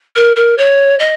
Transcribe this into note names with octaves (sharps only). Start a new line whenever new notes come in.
A#4
A#4
C#5
D#5